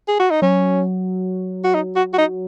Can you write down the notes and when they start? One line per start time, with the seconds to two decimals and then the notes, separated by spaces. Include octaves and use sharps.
0.08 G#4
0.19 F#4
0.31 D#4
0.42 F#3 C#4
1.64 F#4
1.74 D#4
1.96 F#4
2.13 F#4
2.18 D#4